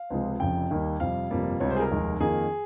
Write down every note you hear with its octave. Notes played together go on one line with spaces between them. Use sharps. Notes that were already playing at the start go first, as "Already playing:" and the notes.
Already playing: F5
C#2 C3 F3 G#3
F1 F2 C#3 G5
D#2 D#3 G3 A#3
F2 C3 G3 F5
G1 F2 C3 G3 A#3
C#2 C3 G3 C#5
C5
G#4
A#4
F1 D#2 D#3 G#3
F2 D#3 A#3 G#4